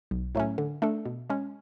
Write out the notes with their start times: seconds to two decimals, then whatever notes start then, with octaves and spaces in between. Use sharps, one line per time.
0.11 B1
0.35 A2 F#3 A3 C#4
0.58 D3
0.82 A3 D4 A4
1.05 B2
1.30 G#3 C#4